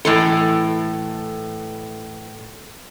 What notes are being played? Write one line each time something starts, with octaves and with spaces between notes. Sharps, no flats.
A2 E3 A4